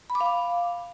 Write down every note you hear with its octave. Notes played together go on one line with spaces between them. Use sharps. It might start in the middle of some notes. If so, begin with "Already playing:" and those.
B5
D6
F5
D6